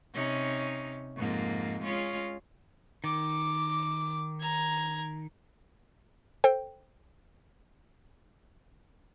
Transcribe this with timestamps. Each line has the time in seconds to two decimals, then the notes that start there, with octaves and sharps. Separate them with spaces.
0.13 C3 C#4 D#4
1.16 F2 G#2 A#3
1.84 G#3 C#4 F4
3.04 D#3 D6
4.40 A#5 G#6
6.44 A4 C5 G5